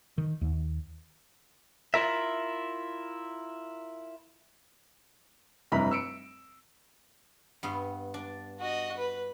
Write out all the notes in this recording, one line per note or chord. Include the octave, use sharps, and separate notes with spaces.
D#3
D#2
E4 F4 A#4 E5
F1 G2 E4 A#5 B5 B6
E6 C#7 D7
G2 B3 C6
D4
F#4 D#5
B4